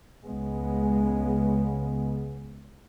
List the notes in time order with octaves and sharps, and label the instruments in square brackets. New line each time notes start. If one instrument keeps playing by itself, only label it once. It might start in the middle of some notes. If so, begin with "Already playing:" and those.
[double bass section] C#2 C#3 G#3 B3